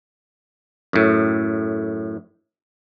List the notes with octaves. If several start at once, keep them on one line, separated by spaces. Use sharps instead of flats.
F#2 A2